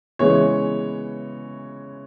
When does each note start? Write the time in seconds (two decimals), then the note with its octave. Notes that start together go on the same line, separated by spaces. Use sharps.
0.19 C#3 E3 G#3 B3 C#5